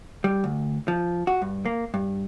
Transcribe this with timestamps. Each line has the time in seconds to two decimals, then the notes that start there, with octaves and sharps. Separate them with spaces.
0.24 G3
0.44 D2
0.88 F3
1.27 F#4
1.42 G2
1.66 A#3
1.94 G2